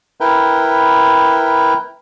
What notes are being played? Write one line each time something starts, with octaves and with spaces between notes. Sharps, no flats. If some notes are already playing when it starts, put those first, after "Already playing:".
E4 A#4 B4 G5